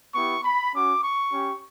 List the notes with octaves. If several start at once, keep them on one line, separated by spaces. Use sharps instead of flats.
B3 E4 G4 C#6
B5
C#4 F#4 D6
C#6
C#4 G4